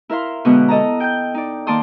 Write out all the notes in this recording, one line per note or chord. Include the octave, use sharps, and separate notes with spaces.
E4 A#4 E5 F5 C6
B2 D3 G#3 B3 F#5
A4 D#5 A5 A#5
G5 G6
D#4 D5
D#3 A#3 D5 A5 C6 D#6